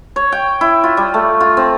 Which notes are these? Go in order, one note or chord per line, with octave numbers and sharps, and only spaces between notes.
C#5
G5
E4
F4
G3
A3
F4
C4